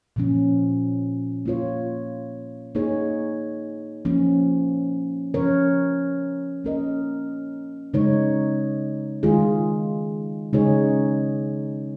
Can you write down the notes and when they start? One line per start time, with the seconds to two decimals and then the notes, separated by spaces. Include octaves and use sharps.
0.16 A#2 F3 C#4
1.46 A#3 F4 C#5
2.75 A#3 D#4 G#4 C#5
4.05 F3 A#3 C#4
5.34 F3 C#4 A#4 C#5
6.64 A#3 C#4 A#4 D#5
7.94 C#3 G#3 D#4 C#5
9.23 D#3 G#3 F4 G#4
10.53 C#3 G#3 D#4 G#4 C#5